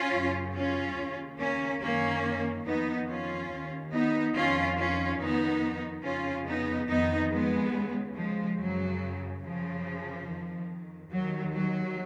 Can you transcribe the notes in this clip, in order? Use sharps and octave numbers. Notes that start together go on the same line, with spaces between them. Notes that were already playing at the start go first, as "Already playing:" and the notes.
Already playing: C#4 F4
F#2 C#3
C#4 F4
D#2 C#3
A#3 C#4
F#2 D#3 A#3 C#4
F2 D#3 B3 D#4
C#4 F4
D#2 D#3
B3 D#4
F2 D#3 C#4 F4
C#4 F4
F2 D#3 B3 D#4
F2 C#3 C#4 F4
B3 D#4
F2 D#3 B3 D#4
G#3 B3
D#2 C#3
F3 G#3
F#2 C#3 F#3
F#2 C#3 F3
F2 D#3
D#2 D#3 F#3
F#3